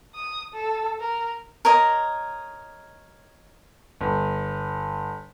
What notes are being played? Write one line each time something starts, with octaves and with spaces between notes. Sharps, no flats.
D#6
A4
A#4
A#4 C#5 D#5
G1